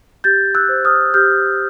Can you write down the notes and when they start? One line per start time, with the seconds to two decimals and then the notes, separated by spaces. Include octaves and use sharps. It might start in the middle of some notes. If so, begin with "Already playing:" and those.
0.24 G4 G6 A6
0.55 E6 F#6
0.69 C5
0.85 D#6 F6
1.14 G4 F6 G6